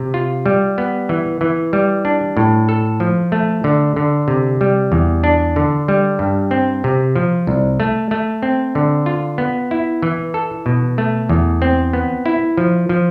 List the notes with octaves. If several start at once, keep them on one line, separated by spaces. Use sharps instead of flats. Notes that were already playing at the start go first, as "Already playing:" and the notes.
Already playing: C3
F4
G3
B3
E3
E3
G3
D4
A2
A4
F3
A3
D3
D3
C3
G3
E2
D4
D3
G3
G2
C4
C3
F3
C2
A3
A3
C4
D3
F4
B3
E4
E3
A4
B2
A3
E2
C4
B3
E4
F3
F3